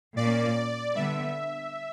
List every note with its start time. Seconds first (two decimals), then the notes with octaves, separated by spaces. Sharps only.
0.16 A#2 A#3 C#4 D5
0.95 D3 G3 B3 E5